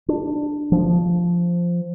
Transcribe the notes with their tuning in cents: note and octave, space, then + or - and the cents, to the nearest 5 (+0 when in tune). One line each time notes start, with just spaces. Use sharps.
D4 +10
F3 -5